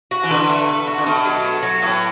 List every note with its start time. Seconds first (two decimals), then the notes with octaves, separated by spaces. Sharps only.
0.11 F#4
0.23 E3
0.30 D3 B4
0.49 A3
0.69 B4
0.87 F#4
0.98 D3
1.06 B2 A3
1.25 F#3
1.44 A3
1.63 F#3
1.82 A2 B3